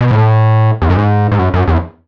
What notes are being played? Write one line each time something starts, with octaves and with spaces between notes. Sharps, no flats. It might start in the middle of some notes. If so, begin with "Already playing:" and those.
B2
A2
E2
F#2
G#2
G#2
F#2
F#2
E2